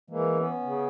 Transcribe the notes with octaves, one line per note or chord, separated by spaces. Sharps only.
E3 G#3 A#3
B3 C#4
C#3